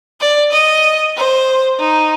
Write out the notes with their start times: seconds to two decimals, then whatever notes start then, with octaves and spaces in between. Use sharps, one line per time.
0.21 D5
0.53 D#5
1.17 C5
1.80 D#4